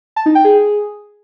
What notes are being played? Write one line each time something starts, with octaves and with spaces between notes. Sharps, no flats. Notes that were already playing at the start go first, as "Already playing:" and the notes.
A5
D#4
G5
G#4